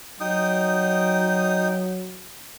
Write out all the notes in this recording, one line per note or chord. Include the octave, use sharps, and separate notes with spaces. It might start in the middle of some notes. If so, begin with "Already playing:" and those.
F#3 D#4 G5 D#6